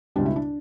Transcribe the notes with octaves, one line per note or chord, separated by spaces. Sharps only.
C#2 B2 G3 D4
E4
D4